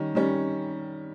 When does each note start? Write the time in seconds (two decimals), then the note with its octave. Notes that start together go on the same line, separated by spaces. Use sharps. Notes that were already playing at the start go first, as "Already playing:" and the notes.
Already playing: D#3 G3 C#4
0.15 D#3 G3 C#4